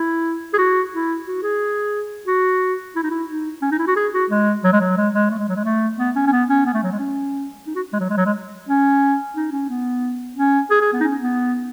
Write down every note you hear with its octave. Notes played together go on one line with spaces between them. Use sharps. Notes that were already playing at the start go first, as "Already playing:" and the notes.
Already playing: E4
G#4
F#4
E4
F#4
G#4
F#4
E4
D#4
E4
D#4
C#4
D#4
E4
F#4
G#4
F#4
G#3
F#3
G#3
F#3
G#3
G#3
A3
G#3
F#3
G#3
A3
B3
C#4
C#4
B3
C#4
B3
A3
F#3
G#3
C#4
D#4
F#4
G#3
F#3
G#3
F#3
G#3
C#4
D#4
C#4
B3
C#4
G#4
G#4
B3
D#4
C#4
B3